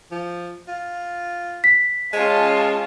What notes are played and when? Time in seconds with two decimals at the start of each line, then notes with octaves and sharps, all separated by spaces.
0.11 F3
0.68 F4
1.64 B6
2.13 G#3 C#4 F4 A5